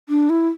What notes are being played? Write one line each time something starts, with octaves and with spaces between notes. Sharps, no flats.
D4
E4